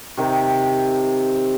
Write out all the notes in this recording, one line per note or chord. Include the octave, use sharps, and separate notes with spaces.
C3 D#3